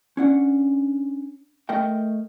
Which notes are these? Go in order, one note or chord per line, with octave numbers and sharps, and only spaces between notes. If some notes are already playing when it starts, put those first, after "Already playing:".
C#4 D4 F#5
A3 A#4 D#5 G5